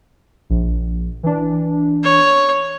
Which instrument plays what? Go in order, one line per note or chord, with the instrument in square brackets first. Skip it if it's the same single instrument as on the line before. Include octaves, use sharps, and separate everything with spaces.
[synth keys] A#1
E3 D4
[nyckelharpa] C#5